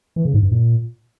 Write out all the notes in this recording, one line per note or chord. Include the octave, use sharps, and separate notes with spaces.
E3
C#3
G#2
G2
A#2